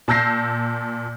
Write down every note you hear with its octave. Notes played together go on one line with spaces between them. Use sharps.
A#2 A5 E6 G6 A#6 C7